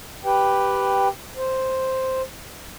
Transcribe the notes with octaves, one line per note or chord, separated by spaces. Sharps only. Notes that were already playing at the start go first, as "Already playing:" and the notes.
G4 B4 G5
C5